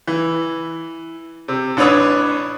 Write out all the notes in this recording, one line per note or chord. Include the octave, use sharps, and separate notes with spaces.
E3
C3
A1 D4 B4 C#5 D#6